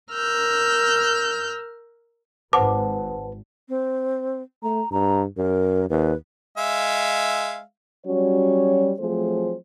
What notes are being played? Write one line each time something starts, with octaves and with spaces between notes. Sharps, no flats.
A#4 E6 F6 G6
G#1 B4 C5 F#5 A5 D6
C4
A3 A#5
G2 A#5
F#2 A#4
D#2 B4
G#3 E5 F5
F#3 G3 C#4 F#4 C#5
F3 F#3 A3 C4 G#4 C5